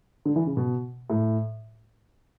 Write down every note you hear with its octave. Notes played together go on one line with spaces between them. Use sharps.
D3
E3
C#3
B2
A2